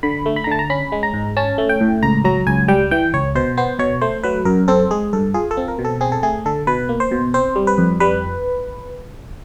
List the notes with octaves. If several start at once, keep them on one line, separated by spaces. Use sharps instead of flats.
D3 B5
A3
B5
A#5
D3 A5
A#5
C#4 B5
G#3
A#5
G#2
C#4 A5
A3
G5
A2
C#2 A#5
F#3 A#5
C#2 G#5
G3 G5
E3 G5
C#2 C#5
B2 C5
B3 C5
B2 C#5
A3 C5
F#3 B4
F#2 A#4
C4 A4
G#3 G#4
G2 A4
F4 G#4
A4
C4
A#4
B2
A4
C4 G#4
A4
A3 G#4
D3 A4
B2 B4
A#3
C5
B2
C4 C5
G3
B4
F2
G3 B4